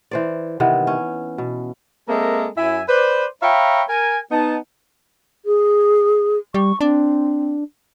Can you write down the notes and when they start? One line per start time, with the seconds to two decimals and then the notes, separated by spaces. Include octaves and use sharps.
0.11 E3 C5 D5
0.60 C3 D#3 E3 B3
0.87 C#4
1.38 B2
2.09 G#3 A#3 C4 A4 A#4 E5
2.58 F#2 E4 E5 G#5
2.89 B4 C5 D5
3.43 C#5 E5 F5 G5 A#5 B5
3.89 A#4 G#5
4.31 B3 D#4 A5
5.45 G#4
6.54 G3 C#6
6.81 C4 D4